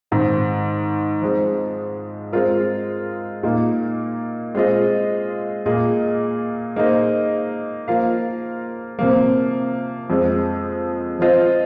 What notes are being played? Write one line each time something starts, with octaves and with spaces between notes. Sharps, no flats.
G#2 D#3 C4
F3 G#3 C4
G#3 C4 F4 A#4
A#2 A#3 D#4
G#3 C4 F4 G#4 D#5
A#2 A#3 G#4 D#5
A#3 D#4 G#4 C5 D#5
F3 A#3 F4 A#4 F5
C3 F3 A#3
F2 F3 G#3
F3 C4 F4 C5 D#5